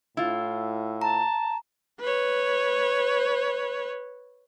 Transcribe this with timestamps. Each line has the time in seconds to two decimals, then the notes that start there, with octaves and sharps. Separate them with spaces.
0.17 A2 E4 F4
1.02 A5 A#5
2.00 B4 C#5